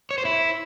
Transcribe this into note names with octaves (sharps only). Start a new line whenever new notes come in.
C#5
C5
E4